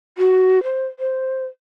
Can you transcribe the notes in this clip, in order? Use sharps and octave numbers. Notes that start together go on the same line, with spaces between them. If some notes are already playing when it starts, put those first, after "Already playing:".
F#4
C5
C5